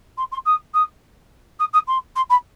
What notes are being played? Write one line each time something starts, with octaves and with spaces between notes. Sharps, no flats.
C6
C6
D#6
D#6
D#6
D#6
C6
C6
B5